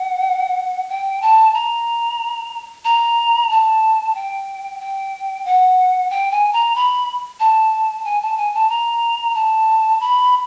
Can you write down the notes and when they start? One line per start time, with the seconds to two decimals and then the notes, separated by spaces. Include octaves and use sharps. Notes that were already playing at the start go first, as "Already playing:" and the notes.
Already playing: F#5
0.89 G5
1.22 A5
1.54 A#5
2.85 A#5
3.50 A5
4.15 G5
4.80 G5
5.45 F#5
6.10 G5
6.31 G#5
6.53 A#5
6.75 B5
7.40 A5
8.04 G#5
8.22 A5
8.37 G#5
8.54 A5
8.70 A#5
9.35 A5
10.00 B5